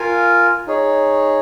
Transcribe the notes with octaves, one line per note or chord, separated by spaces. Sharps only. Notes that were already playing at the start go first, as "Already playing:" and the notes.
Already playing: F4 A#4 F5 G#5
D#4 G#4 C#5